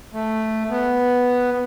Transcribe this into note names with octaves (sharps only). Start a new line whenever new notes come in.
A3
B3